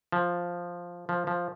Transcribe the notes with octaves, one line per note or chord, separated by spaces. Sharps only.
F3
F3
F3